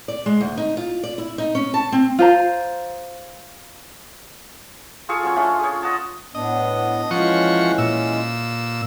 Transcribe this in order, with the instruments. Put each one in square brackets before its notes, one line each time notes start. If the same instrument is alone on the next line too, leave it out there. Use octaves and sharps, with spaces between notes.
[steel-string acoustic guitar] D5
G#3
D2
D#4
F4
D5
E4
D#4
C#4
A5
C4
[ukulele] F4 C5 A#5
[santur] F4 G#4 A4 C#6
F#3 C#4 C#5
A3 C#4 D4 F4
G#4 C#5
D#5 F#5 A5
[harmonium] A2 B3 D4 [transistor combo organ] D#5
[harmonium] E3 G#3 C#4 [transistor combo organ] F3 F#5 C#6
[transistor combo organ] A#2 E6